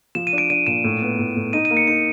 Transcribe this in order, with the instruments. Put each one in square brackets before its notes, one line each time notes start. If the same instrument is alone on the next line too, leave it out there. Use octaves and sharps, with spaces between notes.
[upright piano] F3 [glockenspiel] E7
[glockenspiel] D#7
[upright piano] D4
[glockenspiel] D7
[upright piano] D4 [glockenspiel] D#7
[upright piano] A#2 [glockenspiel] E7
[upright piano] A2
B3
A2
A2
[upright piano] D#4 [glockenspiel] D#7
[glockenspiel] D#7
[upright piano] A#3
[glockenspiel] C#7
[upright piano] D#4 [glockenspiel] C#7